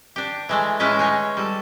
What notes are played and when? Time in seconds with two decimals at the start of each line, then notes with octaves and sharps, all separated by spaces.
0.16 D4 G4
0.49 E3 G#3 A3
0.80 A2 G#3 C#4 E4 B4 A5
0.99 D#4 G#4 C#5
1.37 G3 A4